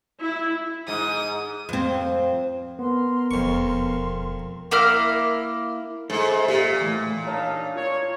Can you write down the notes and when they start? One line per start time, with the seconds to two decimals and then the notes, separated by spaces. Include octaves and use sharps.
0.22 E4
0.88 G#2 D#6
1.69 F2 C4
2.79 B3 A#4 C6
3.31 E1 F2 F3 C#6
4.71 A#3 E4 F6
6.10 G#2 A4 E5
6.48 A#2 G4
6.81 A2 E3
7.27 D4 D#4 A#4 C#5 F5 A5
7.76 F4 C#5